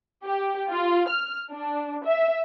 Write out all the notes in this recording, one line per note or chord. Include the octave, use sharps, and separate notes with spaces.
G4
F4
F6
D4
E5